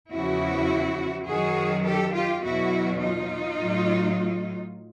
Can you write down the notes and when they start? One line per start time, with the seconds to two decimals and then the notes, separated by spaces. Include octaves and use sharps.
0.12 E2 C#3 F3 E4 F#4
1.27 F#2 D#3 F#3 F#4 G#4
1.86 G4 A4
2.15 F4 G4
2.43 E2 B2 F#3 E4 F#4
3.01 D#4 F4
3.59 A2 F#3